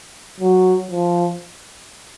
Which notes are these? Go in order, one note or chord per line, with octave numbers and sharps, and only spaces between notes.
F#3
F3